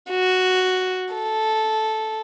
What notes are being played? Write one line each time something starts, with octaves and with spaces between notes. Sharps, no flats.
F#4
A4